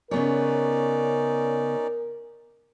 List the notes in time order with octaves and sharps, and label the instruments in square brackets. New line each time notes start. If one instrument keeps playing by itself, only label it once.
[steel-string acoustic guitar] C#3 B3 C#5 [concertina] C#4 D#4 D5 [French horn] A#4